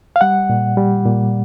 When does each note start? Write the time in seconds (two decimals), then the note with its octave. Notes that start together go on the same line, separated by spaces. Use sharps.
0.16 F5
0.21 G3 F#5
0.50 A#2
0.77 G3
1.05 A#2